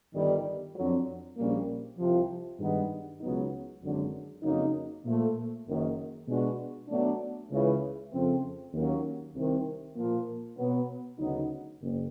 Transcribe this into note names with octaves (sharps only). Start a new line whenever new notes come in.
G1 G2 D#3 G3
F2 D3 F#3
A#1 A#2 G3 A#3 C#4
C2 C3 F3
G2 D#3 G#3 B3 D#4
C#2 B2 F#3 B3 D#4
G#1 F#2 D3 F#3
F2 C#3 F#3 A#3 D#4
A#2 F3 A3
F#1 F#2 D#3
B2 G#3 B3 D4 F#4
B2 F#3 A3 D4
C#2 C#3 E3
F2 C#3 F3 A3 C4
D#2 D#3 F#3 A#3 C#4
C2 C3 D#3
A#2 F3 A#3
B2 F#3 B3
D2 C#3 F#3 B3 D#4
F#1